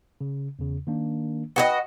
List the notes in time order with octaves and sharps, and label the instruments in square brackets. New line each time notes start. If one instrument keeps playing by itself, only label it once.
[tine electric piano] C#3
E2 C#3
D#3 A#3 D4
[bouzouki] F#4 G4 D#5 [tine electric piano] B4 B5